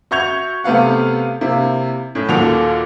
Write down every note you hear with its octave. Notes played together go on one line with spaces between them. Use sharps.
F#4 E5 C#6 G6 G#6 F7
C3 A3 B3 F5 F#5
C3 A#3 E4
A2 C#4
D#2 A#2 F#4 A4 F7